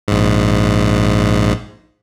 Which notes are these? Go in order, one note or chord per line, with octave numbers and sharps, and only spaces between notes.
A#1 G#2